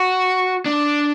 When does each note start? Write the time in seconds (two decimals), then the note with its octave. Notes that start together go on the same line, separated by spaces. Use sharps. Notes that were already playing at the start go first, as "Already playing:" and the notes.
Already playing: F#4
0.66 D4